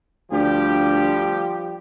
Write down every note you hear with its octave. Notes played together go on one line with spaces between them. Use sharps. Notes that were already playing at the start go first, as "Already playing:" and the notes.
D2 F3 G3 G4